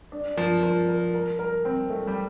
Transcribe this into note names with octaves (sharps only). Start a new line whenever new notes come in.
D4
F3 A#4
F3 A#4
A#4
A#4
A#4
C4
A3
G3